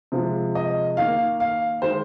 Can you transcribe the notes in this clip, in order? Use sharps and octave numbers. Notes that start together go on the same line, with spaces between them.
C3 F3 G#3
D#5
D#3 A#3 F5
F5
D#3 G#3 C5